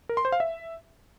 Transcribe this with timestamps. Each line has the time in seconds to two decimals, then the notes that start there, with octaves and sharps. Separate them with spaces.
0.09 A#4
0.17 C6
0.25 C5
0.32 F5
0.40 E5